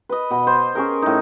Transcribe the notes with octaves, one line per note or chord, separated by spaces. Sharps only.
B4 D#5
B2 B5
C5
C#4 G#4 A#4
A2 D#4